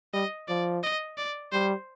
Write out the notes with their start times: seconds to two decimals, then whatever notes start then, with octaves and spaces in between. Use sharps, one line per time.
0.14 G3 D#5
0.48 F3 D5
0.83 D#5
1.18 D5
1.52 G3 C5